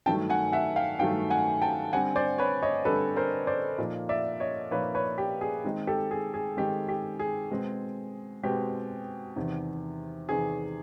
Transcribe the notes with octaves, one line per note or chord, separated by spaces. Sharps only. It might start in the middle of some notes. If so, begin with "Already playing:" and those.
G2 D#3 F#3 A3 G5 A5
F#5 G#5
E5 F#5
F5 G5
G2 D#3 F#3 A3 F5 G5
F#5 G#5
G5 A5
D3 G3 C4 F#5 G#5
C5 D5
B4 C#5
C#5 D#5
D3 G3 C4 A4 B4
A#4 C5
C5 D5
A#2 F3 A#3 D#4
D5 E5
C#5 D#5
A#2 F3 A#3 D#4 B4 C#5
B4 C#5
G4
G#4
D#3 G#3 C4 D#4
G4 A4
G#4
G#4
D#3 G#3 C4 D#4 G4
G4
G#4
B2 G#3 C4
B2 G#3 C4 G4
E2 C3 D#3
E2 C3 D#3 G#4